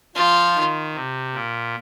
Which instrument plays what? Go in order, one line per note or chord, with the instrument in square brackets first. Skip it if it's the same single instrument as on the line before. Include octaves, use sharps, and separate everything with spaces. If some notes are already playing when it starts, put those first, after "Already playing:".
[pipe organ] F3 [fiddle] F4
[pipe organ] D#3
C3
A#2